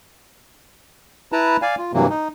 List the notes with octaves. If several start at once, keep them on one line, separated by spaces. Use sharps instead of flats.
E4 B4 A5 A#5
D5 F5 G#5
F4
G2 C3 E3 F#3 A#3
D#4